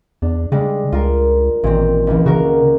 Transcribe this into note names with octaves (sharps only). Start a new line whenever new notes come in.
E2 D4
C#3 G3 G#3 D4
C#2 F4 A#4
A1 A#2 D#3 C4
C#2 E3
C#3 F#4 A#4